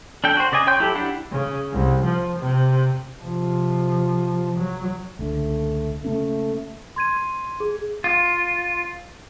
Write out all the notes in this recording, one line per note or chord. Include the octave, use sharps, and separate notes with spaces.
D4 A4 G5
F#4 C5
C#3 D5 D#5 G#5
C#5 G5 C6 G6
F#3 E4 G4 A4
D4 E4 G4 F#5
C#3
C2
F3
C3
C3 F3
F#3
C#2 D3 A3
C#3 A3 A#3 C#4
C6 G#6 D#7
G#4
F4